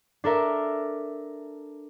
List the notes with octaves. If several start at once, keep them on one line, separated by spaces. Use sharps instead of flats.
D4 A4 A#4 E5